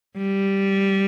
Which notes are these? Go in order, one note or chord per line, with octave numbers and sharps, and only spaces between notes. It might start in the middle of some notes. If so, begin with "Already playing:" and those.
G3